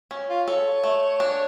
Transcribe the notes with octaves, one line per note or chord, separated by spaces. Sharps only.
C#4
F4
A4 C#5
A3
D4